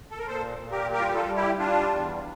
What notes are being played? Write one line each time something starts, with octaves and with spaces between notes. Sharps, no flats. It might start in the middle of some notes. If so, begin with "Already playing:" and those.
A4
A#4
A#2 A4 C5
A#2
G4 A#4
G3 G4 A#4
F4
G4
F4 A4
G3
E4 G4
G3 D4 F4
E2